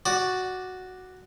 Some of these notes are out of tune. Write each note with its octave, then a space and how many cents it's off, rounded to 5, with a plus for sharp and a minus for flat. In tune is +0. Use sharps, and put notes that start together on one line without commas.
F#4 +0 D5 +0